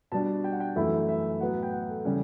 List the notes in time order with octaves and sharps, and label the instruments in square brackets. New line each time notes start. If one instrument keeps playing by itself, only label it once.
[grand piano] B2 G3 D4 A5
G5
F#5
G5
F#2 E3 A3 E4 E5
E5
A2 F#3 B3 F#5
G5
F#5
A4
C#3 E3 G3 C#4